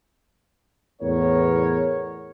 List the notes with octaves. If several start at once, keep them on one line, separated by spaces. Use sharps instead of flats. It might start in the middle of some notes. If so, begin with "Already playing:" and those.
E2 A2 B3 A#4 C#5